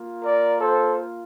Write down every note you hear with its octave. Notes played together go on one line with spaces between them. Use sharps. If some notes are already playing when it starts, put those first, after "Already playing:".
Already playing: A#3 F4
A#4 D5
A4 C5